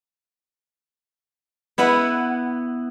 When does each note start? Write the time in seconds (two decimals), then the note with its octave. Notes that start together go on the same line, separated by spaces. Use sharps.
1.78 B3 E4 B4 F#5